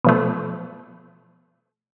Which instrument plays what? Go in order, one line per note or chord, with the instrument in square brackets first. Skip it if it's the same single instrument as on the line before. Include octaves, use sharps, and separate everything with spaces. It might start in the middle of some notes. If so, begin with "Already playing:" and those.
[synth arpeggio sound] B2 F3 A3